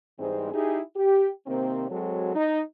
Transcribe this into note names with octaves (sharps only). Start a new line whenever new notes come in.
G#2 E3 G3 G#3 C4
D#4 E4 G4 G#4
G4
C3 D#3 A#3 C4
F#3 G#3 C4 F#4 A4 C#5
D#4